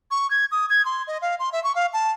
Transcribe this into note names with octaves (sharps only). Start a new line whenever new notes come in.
C#6
G#6
D#6
G#6
C6
D#5
F5
C6
E5
C#6
F5
A5